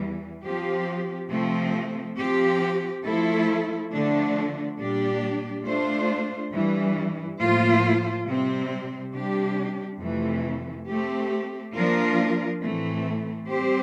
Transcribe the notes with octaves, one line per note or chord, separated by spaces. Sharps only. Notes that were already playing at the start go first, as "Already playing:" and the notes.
Already playing: E2 E3 G3
F3 C4 G4
C3 F3 A3 C4
F3 C4 G4
F3 A3 E4 A4
D3 F3 A3 D4
A#2 G3 D4 G4 D5
A3 D4 F4 C5
G2 E3 G3
A2 F3 A#3 F4 C5
C3 G3 C4
C3 G3 D4 G4
F2 C3 E3 A3
A3 C4 G4
F3 A#3 D4 F4 A#4
A2 E3 A3 C4
G3 C4 G4 C5